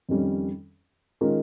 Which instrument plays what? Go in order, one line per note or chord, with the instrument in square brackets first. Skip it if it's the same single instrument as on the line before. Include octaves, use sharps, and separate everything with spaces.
[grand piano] F2 D#3 G3 C#4
D#3 G#3 C#4 F4 A#4